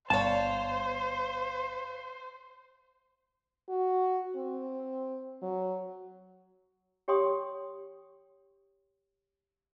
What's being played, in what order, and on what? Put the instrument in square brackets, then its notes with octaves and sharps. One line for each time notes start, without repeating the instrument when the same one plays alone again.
[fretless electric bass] G1 [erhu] C5 [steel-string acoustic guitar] C#5 F5 [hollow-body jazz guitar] A5
[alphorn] F#4
C4
F#3
[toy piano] G4 C#5 G5 C6 D#6